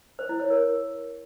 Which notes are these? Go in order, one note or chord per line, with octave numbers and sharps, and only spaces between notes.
C5
E4
C#5
A#4